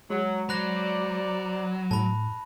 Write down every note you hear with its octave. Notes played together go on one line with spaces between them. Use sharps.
F#3 G#3
F#3 C5 D5 B5 F#6 A#6
A2 A5 B5